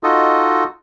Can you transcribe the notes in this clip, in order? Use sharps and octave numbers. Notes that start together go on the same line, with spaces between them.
D#4 F4 F#4 A4 D#5